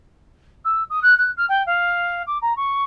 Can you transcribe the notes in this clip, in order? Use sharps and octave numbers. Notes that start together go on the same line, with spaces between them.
E6
D#6
F#6
F#6
F6
G5
F5
D6
A#5
C#6